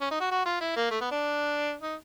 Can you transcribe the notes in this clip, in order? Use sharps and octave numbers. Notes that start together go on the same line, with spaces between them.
C#4
D#4
F#4
F#4
F4
E4
A#3
A3
B3
D4
D#4